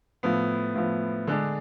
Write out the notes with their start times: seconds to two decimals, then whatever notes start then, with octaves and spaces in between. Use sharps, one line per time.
0.23 A2 F3 B3
0.75 A2 F3 B3
1.27 D3 G#3 D4